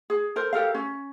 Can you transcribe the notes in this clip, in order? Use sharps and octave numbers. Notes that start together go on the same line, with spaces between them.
G#4
A4 A#4 C5
G4 A4 A#4 F5
C#4